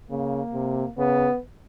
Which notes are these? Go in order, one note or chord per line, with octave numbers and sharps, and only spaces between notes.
C#3 A#3
C3
C#3 B3